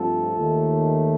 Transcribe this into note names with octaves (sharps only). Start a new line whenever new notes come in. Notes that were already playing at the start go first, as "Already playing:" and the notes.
Already playing: G2 F3 A3 C4 F4 A4
D#2 D#3 A3